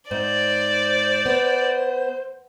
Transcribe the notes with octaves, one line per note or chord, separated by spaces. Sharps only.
G#2 C5 D5
B3